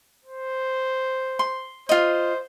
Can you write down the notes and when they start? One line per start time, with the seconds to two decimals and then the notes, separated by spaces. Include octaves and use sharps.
0.25 C5
1.39 C6
1.89 F4 C5 D#5